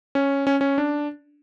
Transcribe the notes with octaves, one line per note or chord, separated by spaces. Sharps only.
C#4
C#4
C#4
D4